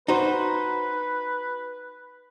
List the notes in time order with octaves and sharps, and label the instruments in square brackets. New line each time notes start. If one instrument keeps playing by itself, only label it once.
[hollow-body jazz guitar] D#4 F#4 C5 [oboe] B4